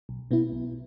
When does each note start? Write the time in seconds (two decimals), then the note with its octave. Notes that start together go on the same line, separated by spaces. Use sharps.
0.09 B1
0.31 B2 B3 E4
0.52 B1